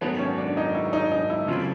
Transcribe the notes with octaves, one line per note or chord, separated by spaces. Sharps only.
G#2 D#3 F#3 A3 B3
C#4
D4
D#4
E4
D#4
D#4
E4
C#3 F#3 A3 C4 E4 F4